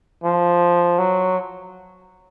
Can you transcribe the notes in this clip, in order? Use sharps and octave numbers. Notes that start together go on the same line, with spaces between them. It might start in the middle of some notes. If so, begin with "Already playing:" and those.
F3
F#3